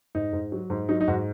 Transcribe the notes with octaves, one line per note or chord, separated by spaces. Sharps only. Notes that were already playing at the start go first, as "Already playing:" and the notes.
G#2 D#4
G#2
F#3
G#2
F#3 D#4
D#4
G#2 F#4